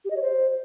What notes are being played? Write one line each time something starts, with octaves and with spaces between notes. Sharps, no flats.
G4
D#5
C#5
C5